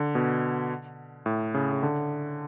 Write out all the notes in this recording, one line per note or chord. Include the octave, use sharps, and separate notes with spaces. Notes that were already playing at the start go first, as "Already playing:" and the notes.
Already playing: D3
B2
A2
C#3
C#3
D3